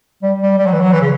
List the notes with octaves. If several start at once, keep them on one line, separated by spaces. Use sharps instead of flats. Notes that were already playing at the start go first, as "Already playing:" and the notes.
G3
G3
G3
F#3
E3
F#3
E3
C#3